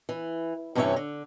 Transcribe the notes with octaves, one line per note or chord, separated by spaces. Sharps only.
E3
G2 C3 E3 C#4 C#5 E5
D3